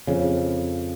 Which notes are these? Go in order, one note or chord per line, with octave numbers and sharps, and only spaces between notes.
F2 C#3